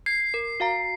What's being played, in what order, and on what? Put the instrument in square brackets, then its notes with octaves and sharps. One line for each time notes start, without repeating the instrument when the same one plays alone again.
[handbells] G#6 [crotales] C7
[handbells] A#4
F#4 F5 A#5